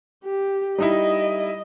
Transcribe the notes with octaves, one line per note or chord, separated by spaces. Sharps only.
G4
G3 D#4 E4 D#5